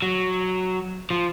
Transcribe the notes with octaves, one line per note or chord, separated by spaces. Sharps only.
F#3
F3